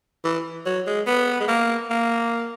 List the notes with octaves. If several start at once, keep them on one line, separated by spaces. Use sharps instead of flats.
E3
F#3
G#3
B3
G#3
A#3
A#3